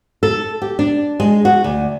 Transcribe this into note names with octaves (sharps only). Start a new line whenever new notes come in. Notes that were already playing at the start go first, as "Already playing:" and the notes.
A4
G4
D4
G#3
F#4
D2